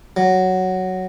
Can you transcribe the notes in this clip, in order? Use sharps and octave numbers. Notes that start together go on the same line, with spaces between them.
F#3